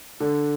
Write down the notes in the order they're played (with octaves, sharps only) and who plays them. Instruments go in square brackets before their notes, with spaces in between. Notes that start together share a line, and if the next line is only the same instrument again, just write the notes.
[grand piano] D3